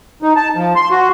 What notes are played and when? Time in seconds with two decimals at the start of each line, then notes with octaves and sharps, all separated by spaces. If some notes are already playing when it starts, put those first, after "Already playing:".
0.22 D#4
0.36 A5
0.56 F3
0.76 C6
0.91 F#4